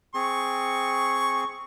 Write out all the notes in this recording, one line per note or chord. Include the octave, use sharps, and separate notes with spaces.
C4 G#4 C#6